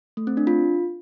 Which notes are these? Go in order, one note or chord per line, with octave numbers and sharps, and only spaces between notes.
A3
C4
D4
F4